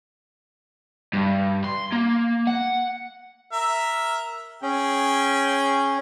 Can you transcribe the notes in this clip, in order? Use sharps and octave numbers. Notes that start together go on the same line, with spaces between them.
G2
C6
A#3
F#5
A#4 E5
C#4 G#4 G5